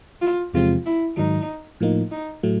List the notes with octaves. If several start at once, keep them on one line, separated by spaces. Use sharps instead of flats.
F4
E2 C3 F3 G#3 C4 F4
E4
G#2 D#3 F#3 D#4
A2 F3 A#3 D#4
D#4
A2 F#3 A3